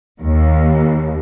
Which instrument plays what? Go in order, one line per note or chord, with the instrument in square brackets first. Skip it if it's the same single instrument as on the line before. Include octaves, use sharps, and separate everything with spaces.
[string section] D#2